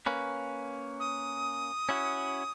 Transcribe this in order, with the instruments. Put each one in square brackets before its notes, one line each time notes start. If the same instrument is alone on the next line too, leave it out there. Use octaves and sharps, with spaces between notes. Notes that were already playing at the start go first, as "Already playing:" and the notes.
[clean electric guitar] A#3 C#4 B4
[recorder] D#6
[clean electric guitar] C#4 E4 F#4